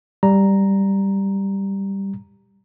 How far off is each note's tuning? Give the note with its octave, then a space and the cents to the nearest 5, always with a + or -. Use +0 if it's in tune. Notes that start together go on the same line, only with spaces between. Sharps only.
G3 +0 A#5 +0